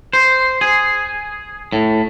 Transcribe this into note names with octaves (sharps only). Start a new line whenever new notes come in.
C5
G#4
A2